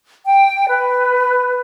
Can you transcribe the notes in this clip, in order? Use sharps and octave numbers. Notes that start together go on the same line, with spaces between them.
G5
B4